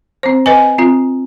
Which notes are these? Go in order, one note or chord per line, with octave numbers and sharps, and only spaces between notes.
C4 C5
B4 D#5 G#5
C4 F4